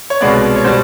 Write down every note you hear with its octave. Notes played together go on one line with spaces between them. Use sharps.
C#5
C2 B2 G#3 B3 D5
C#5
B2 G3 C5